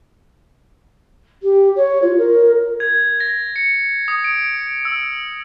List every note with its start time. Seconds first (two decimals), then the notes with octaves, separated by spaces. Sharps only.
1.43 G4
1.76 C#5
2.02 F4
2.18 A#4
2.80 G#6
3.20 A#6
3.56 C#7
4.08 D#6
4.24 D7
4.85 E6